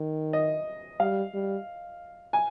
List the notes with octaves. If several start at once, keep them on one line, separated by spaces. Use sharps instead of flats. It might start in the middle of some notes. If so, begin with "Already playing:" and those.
Already playing: D#3
D#5
G3 F5
G3
G#5